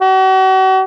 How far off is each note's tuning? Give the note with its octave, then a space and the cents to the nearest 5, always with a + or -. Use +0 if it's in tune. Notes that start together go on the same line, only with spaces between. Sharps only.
F#4 +40